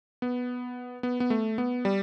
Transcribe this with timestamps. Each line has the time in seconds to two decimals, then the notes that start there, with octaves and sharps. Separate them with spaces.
0.22 B3
1.03 B3
1.20 B3
1.30 A3
1.58 B3
1.85 G3